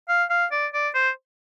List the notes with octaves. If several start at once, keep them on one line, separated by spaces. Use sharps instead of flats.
F5
F5
D5
D5
C5